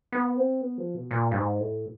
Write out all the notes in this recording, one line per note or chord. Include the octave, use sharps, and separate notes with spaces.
B3
C4
B3
F3
B2
A#2
G2
G#2
A2